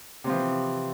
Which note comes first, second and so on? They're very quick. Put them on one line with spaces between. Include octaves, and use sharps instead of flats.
C3 C4 F3 E3